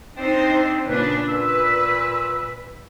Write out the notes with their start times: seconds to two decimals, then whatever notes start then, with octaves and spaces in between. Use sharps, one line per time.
0.17 C4 D4 D#4 C5
0.87 A#2 C#3 C#4 D4 B4
1.28 A#2 B4 E6